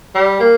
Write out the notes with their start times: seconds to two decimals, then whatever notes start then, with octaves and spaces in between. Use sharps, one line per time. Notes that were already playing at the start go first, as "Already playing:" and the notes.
0.15 G3
0.40 A#3